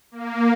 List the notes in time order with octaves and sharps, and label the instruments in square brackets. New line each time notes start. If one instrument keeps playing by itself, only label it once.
[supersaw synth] A#3